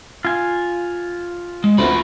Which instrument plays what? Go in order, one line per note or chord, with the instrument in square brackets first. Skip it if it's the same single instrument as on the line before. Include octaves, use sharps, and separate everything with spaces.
[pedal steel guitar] F4 G#5
[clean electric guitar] G#3
[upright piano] D2 B3 [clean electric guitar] F4 A#4 B5